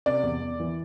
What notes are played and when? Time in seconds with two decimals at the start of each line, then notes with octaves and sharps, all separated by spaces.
0.06 C3 D5
0.23 E2
0.41 E2
0.60 E3